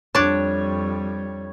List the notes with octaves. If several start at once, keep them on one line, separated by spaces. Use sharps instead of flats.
F2 G3 D4 C#5 A5